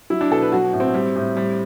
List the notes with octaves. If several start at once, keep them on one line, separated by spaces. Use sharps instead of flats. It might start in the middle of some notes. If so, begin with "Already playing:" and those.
F#3 E4
D4
B2 A4
B4
F#3 F#4
A2
C4
G3
A2
G3